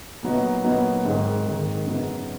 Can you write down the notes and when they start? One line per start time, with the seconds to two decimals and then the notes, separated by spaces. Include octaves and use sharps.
0.23 A#2 F#3 B3 D#4
0.64 A#2 F#3 B3 D#4
1.05 G#1 G#2 D#3
1.46 G#1 G#2 D#3
1.86 F#2 C#3 F#3 B3 D#4